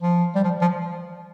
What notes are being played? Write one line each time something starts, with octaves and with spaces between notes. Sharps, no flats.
F3
G3
F3
F3